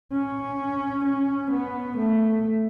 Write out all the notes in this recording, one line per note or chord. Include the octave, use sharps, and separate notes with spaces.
C#4
C#4
B3
A3